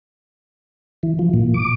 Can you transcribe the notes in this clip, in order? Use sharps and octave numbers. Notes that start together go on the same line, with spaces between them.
E3
F3
A#2
D6